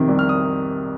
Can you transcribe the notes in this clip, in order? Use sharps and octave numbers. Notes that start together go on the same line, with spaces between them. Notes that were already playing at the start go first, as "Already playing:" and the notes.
Already playing: F2 C3 D#3
C2
F6
D#6